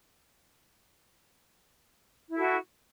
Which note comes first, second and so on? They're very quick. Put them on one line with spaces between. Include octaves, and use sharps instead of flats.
E4 A4 F#4